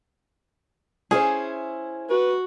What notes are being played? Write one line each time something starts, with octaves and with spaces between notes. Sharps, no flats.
C#4 E4 G#4 C5
F#4 B4